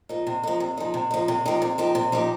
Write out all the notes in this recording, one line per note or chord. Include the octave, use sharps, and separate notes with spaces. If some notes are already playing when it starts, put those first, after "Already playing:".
F3 D#4
C3
F3 D#4
C3
F3 D#4
C3
F3 D#4
C3
F3 D#4 G4
C3
F3 D#4 G4
C3
F3 D#4 G4